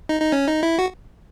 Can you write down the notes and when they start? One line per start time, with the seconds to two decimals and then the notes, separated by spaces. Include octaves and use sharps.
0.09 D#4
0.21 D#4
0.32 C#4
0.47 D#4
0.63 E4
0.78 F#4